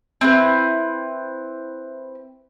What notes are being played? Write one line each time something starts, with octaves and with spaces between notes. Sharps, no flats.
C4 E4 B4